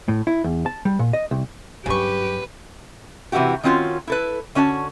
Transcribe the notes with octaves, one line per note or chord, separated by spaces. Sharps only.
A2
E4
E2
A5
G3
A#2
D#5
C2
G2 C#3 F#3 G4 B4 C#6
C3 E3 G3 E4 F#4 G4
D#3 C4 C#4 F4 F#4
E4 A4 B4
D3 C#4 F#4 D5 A5